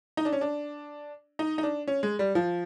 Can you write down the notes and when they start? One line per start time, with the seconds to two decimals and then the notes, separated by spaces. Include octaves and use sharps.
0.17 D#4
0.25 D4
0.32 C#4
0.41 D4
1.39 D#4
1.58 D#4
1.63 D4
1.88 C#4
2.03 G#3
2.19 G3
2.35 F3